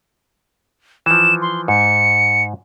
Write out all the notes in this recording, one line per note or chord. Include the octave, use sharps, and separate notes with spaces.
E3 F3 E7
C6
G#2 C#7